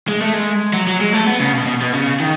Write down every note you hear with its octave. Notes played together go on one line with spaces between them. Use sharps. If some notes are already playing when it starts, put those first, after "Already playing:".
G#3
A3
G#3
F#3
F#3
G#3
A3
B3
C#3
B2
B2
B2
C#3
D#3